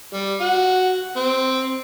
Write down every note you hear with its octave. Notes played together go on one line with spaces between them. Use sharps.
G3
F#4
C4